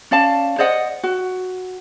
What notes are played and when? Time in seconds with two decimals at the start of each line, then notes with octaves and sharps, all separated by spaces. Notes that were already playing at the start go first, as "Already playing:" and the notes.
0.11 C#4 D5 F5 A5
0.58 C5 D5 D#5 F#5
1.03 F#4